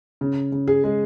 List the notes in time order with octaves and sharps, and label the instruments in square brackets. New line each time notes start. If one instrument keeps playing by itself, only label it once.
[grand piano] C#3
C#3
G#4
G#3